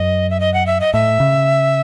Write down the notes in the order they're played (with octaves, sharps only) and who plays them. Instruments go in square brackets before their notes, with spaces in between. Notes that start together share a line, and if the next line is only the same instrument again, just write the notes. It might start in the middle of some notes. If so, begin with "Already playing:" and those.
Already playing: [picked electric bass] F#2 [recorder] D#5
[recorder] E5
D#5
F#5
E5
D#5
[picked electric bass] A2 [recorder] E5
[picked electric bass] C#3